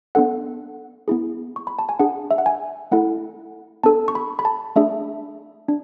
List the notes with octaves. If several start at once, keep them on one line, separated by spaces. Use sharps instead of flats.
B3 D4 A4 F#5
B3 E4 G#4
C#6
B5
A5
G#5
D4 G#4 F#5
E5
F#5
G#5
A3 E4 A4 F#5
B3 D4 A4 A5
C#6
B5
B5
A5
A3 D4 G#4 E5
D4